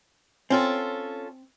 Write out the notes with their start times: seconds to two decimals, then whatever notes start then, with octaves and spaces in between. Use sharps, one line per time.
0.50 C4 C#4 F4 A4